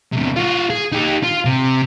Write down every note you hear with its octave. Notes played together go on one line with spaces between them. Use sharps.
E2 C3
F4 F#4
G#4
D#4 G4
F4
C3